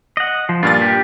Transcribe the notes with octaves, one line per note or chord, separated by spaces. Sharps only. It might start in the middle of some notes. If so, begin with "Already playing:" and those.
D#5 F#5
F3
G2 A#2 D4 F4 A6
G4